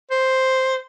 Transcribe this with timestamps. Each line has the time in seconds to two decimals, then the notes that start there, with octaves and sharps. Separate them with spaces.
0.11 C5